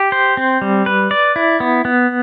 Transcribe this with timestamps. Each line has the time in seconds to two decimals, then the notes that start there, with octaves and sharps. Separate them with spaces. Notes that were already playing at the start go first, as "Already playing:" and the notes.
Already playing: G4
0.12 C5
0.37 C4
0.62 G3
0.86 B4
1.11 D5
1.36 E4
1.60 B3
1.85 B3